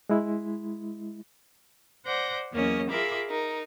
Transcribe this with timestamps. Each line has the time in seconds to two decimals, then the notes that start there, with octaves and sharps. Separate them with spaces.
0.09 G#3 E4
2.05 C5 D5 F#5 G6 A#6
2.51 E2 F#3 A#3 C#4 C#5 D#5
2.90 F4 G#4 A#4 E5 B5 D6
3.29 D#4 A#4